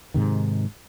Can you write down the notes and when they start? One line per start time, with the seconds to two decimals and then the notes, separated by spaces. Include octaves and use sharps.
0.14 G#2 C3 D#3